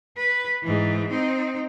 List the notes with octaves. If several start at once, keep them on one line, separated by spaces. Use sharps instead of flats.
B4
G#2 E3
C4 D#4